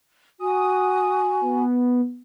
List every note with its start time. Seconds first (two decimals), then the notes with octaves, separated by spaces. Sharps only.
0.40 F#4 G#5 D#6
1.41 B3